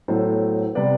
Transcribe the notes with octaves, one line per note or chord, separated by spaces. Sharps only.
A2 F#3 B3 A4 C5
C3 G3 B3 B4 D5